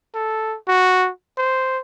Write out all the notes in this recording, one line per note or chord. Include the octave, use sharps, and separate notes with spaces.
A4
F#4
C5